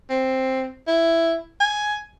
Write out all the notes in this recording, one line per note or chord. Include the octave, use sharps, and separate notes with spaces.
C4
E4
G#5